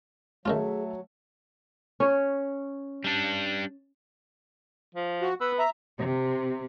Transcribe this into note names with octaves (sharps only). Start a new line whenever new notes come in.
D#3 F#3 A3 C#4 F4 G#4 E5
C#4 C#5
G3 D4
F3
F#4
B3 B4 E6
E5 A#5
C3